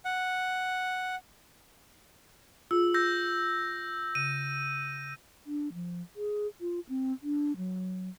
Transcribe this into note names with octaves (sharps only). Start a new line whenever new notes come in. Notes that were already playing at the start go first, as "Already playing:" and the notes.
F#5
F4 G#4 E6
E6 G6 A#6
C#3 D#7
D4
F3
G#4
F4
C4
D4
F#3